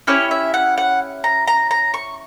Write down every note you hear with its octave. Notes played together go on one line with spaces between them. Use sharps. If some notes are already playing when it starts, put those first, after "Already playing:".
C#4 E4 G4 C#5
E5
F#5
F#5
A#5
A#5
A#5
C#6